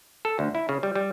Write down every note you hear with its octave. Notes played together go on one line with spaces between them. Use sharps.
A4
D2
E4
C#3
G3
G3